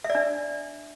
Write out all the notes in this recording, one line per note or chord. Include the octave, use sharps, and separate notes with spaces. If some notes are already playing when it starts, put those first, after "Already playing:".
E5
D5
D4